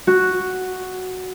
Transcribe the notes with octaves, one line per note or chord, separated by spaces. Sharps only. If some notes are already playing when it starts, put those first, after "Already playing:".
F#4